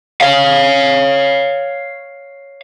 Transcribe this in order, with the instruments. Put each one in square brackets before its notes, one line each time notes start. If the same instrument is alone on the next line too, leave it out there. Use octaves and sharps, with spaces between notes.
[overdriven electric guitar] C#5 F5